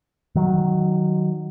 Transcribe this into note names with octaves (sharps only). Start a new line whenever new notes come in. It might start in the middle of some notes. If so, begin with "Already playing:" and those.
D#3 F#3